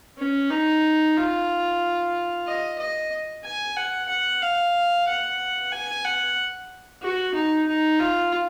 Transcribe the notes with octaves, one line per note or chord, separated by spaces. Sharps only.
C#4
D#4
F4
D#5
D#5
G#5
F#5
F#5
F5
F#5
G#5
F#5
F#4
D#4
D#4
F4